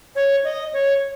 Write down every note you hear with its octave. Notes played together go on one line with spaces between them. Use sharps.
C#5
D#5
C#5